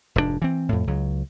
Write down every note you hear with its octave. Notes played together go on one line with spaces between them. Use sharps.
F1 G#2 C3 D4
E3 C4
F2 A2
C#2 F#3